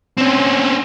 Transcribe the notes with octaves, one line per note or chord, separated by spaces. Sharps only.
C4 C#4